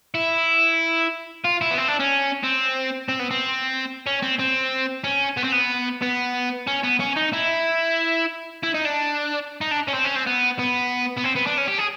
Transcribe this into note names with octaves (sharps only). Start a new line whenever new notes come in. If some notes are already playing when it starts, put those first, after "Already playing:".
E4
F4
E4
B3
C4
D4
C#4
C4
C4
B3
C4
C#4
C4
C4
C#4
B3
C4
B3
B3
C#4
B3
C#4
D#4
E4
E4
D#4
D4
D#4
D4
C#4
C4
C#4
C4
B3
B3
B3
C4
B3
D4
C#4
G4
G#4